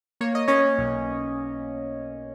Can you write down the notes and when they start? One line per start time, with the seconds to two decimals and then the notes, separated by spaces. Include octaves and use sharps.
0.21 A#3 C#5
0.35 D#5
0.48 A#3 C#4 C#5
0.78 B1